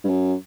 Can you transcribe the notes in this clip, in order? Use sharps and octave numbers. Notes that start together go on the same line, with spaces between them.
G2
F#2